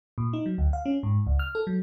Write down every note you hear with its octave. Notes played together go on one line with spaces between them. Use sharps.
A#2
D#4
F#3
D2
F5
C#4
G#2
C#2
F6
A4
F#3